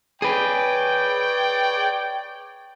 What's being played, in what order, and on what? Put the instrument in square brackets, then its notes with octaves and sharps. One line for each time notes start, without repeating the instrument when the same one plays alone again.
[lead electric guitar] G#4 B4 [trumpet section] C#5 D5 G5